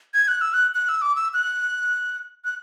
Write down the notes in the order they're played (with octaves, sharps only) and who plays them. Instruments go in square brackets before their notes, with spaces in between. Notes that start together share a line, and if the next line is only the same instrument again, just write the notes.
[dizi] G#6
F#6
E6
F#6
F#6
E6
D6
E6
F#6
F#6